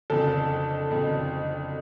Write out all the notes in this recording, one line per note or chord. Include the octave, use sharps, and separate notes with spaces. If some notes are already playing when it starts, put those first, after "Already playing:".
F#1 F2 D3 A4
F#1 F2 D3